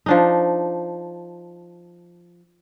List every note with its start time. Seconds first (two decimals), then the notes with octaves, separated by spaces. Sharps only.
0.06 F3 D4 D#4